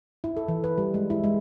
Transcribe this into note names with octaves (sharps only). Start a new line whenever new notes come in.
E4
A4
E3
B4
G3
G#3
E4
G#3